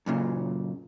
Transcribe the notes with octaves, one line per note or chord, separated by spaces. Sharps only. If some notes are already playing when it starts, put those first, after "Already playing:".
F#2 A#2 C#3